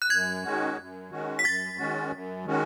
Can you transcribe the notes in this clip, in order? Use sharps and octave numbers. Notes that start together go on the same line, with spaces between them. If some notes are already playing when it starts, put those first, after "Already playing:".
F#6
F#2 G#6
D#3 G#3 C#4 F#4
F#2
D#3 G#3 C#4 F#4
B6
F#2 A6
D#3 G#3 C#4 F#4
F#2
D#3 G#3 C#4 F#4